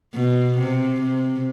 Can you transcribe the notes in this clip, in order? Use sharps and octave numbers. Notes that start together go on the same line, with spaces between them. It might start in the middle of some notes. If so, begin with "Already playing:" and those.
B2
C3
C3